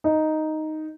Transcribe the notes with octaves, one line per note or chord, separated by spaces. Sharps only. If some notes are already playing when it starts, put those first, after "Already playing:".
D#4